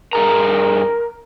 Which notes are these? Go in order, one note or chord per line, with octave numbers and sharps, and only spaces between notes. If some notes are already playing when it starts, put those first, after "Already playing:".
G2 G#4 A#4 A#5